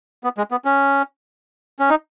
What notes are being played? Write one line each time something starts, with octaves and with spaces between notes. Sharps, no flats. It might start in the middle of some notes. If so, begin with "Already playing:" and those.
B3
G#3
B3
C#4
C#4
D#4